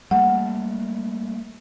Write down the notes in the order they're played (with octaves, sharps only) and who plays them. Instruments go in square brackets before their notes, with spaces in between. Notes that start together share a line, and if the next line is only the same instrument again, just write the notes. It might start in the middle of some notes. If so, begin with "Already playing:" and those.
[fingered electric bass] G3 A3 A#3 [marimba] F#5